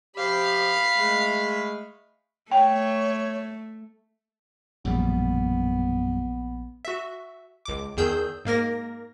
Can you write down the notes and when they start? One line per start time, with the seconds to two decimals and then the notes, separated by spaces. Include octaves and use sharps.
0.16 C3 F3 G4 F5 B5
0.96 G#3 A3
2.52 A3 C#5 G5
4.85 A#1 F#2 B2 G3 B3
6.85 F#4 E5
7.65 C#2 D6
7.97 E2 D#3 G#4 E6 G6
8.45 G#2 A#3 A#4 A#6